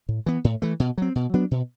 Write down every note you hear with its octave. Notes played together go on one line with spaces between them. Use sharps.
A2
E3 B3
A2
E3 A3
B2
F#3 C4
B2
F#3 B3 D4
B2